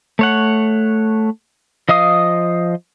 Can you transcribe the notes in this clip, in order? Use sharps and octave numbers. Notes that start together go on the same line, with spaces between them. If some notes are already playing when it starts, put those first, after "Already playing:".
A3 C#5 F#5
F3 D#5 F5 D#6